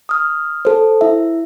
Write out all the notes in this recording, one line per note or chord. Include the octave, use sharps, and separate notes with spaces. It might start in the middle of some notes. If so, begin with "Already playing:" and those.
D#6 F6
A4 C5
E4 E5